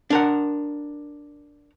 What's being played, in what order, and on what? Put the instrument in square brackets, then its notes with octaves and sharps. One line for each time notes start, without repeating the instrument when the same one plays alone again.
[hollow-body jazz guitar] D4 A#4 F#5